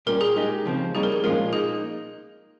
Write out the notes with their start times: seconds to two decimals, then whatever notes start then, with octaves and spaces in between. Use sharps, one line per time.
0.06 A#2 G3 C#4 G4 A#4
0.21 G#4
0.36 G#3 D#4 G4
0.65 C#3 F3 C4
0.95 G3 A#3 D#4 G4 G#4 C#5
1.03 A#4
1.12 G#4
1.24 A#2 F3 G#3 C#4 F4 A#4
1.53 A#3 D#4 G#4